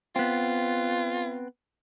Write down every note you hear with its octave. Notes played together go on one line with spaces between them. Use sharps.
B3 C4 F4